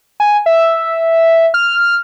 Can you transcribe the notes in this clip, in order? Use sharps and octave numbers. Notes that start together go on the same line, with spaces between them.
G#5
E5
F6